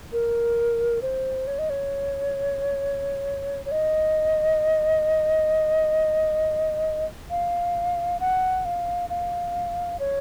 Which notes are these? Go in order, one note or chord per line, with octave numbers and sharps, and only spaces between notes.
A#4
C5
C#5
D#5
C#5
C#5
D#5
F5
F#5
F5
F5
C#5